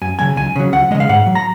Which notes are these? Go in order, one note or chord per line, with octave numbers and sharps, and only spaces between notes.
F#2 G#5
C#3 F#3 G#5
C#2 G#5
C#3 F#3
C#2 F#5
C#3 G#3 D#5
F5
G#2 F#5
F#3
A#5